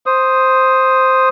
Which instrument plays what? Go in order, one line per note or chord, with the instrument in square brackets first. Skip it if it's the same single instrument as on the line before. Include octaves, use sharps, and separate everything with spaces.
[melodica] C5 D#6